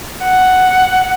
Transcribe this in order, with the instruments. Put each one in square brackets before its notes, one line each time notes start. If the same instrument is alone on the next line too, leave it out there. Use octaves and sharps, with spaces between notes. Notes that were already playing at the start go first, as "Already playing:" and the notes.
[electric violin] F#5